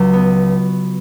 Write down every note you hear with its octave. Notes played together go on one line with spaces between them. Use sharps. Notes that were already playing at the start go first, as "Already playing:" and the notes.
Already playing: C#2 F#3
B3